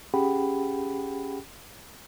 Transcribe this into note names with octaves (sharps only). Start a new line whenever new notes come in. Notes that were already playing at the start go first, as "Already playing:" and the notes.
C#4 G4 G#4 F#5 G5 B5